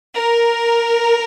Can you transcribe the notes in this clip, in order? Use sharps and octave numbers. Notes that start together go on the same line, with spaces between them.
A#4